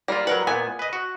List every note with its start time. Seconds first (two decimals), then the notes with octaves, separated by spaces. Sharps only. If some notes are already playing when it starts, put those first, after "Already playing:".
0.08 G3 A#3 F4
0.27 F#3 A#4 B4 F#5
0.47 A#2 B3 G#5
0.79 B4 D#5
0.93 F#4